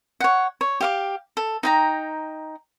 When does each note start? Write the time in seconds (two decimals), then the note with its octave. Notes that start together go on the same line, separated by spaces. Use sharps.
0.20 C#5 F#5
0.61 C#5
0.80 G4 F5 D6
1.37 A4
1.63 D#4 G5 A#5